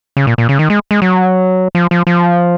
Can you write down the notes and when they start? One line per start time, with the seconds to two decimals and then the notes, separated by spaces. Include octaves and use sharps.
0.17 C#3
0.27 A#2
0.38 A#2
0.49 C#3
0.59 D#3
0.70 G#3
0.91 G#3
1.02 F#3
1.75 F3
1.91 F3
2.07 F3